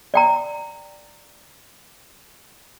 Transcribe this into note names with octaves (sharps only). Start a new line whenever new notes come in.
D5 G5 A#5